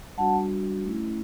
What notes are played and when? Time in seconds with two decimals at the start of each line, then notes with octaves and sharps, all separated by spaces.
0.17 G3 D4 F#4 F#5 A5
0.83 A3 C#4 E4